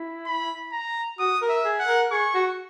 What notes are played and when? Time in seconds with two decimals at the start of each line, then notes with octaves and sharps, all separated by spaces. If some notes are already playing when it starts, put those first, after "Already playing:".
Already playing: E4
0.26 B5
0.72 A#5
1.19 F#4 D#6
1.42 A#4
1.49 E5
1.65 G#4
1.80 F#5
1.88 A#4
2.11 G#4 C#6
2.34 F#4